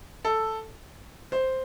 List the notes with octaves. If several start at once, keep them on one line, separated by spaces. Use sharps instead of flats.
A4
C5